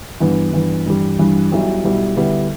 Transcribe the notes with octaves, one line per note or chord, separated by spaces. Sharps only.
G2 E3 B3
G2 E3 B3
G2 E3 G3
G2 E3 G3
B1 B2 G3 E4
B1 B2 G3 E4
D2 D3 G3 B3 E4